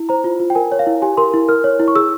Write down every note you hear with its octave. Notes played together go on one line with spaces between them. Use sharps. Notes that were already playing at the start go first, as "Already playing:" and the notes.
Already playing: E4
C5 A#5
F4
F4
G5
A#4 G#5
C#5
F5
E4
G4 G#5
A#4 C6
E4
A#4 F6
C#5
E4
C#6
G#4 E6